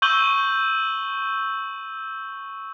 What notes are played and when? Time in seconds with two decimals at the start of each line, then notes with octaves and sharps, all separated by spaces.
0.02 C#6 E6 G6 D#7 F#7 G7